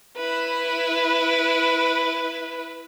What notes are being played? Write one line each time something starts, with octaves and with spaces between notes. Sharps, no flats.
E4 B4